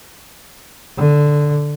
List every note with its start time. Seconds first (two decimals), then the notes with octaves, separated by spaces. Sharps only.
0.97 D3